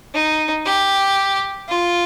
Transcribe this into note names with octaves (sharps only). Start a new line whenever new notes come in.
D#4
G4
F4